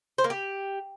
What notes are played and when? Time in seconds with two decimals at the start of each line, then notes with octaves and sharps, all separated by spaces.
0.18 C5
0.24 A#3
0.30 G4